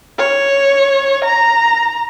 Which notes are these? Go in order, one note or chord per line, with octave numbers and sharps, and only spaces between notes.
C#5
A#5